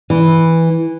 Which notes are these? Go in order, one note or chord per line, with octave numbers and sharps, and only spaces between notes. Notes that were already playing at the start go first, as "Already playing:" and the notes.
E3